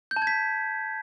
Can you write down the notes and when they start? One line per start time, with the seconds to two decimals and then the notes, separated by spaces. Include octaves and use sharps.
0.11 G6
0.16 A5
0.22 G#6
0.27 B6